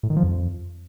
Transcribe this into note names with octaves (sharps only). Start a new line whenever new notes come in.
A2
D#3
F3
F2